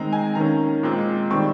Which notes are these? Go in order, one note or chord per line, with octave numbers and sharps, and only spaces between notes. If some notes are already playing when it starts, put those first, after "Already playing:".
Already playing: D#3 G#3 C4 A#5
G#5
D#3 A#3 C#4 A#5
A#2 G#3 C4
D#3 G3 C4 C#6